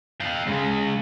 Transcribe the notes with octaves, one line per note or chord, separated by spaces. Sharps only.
F5 G5
C#3 G#3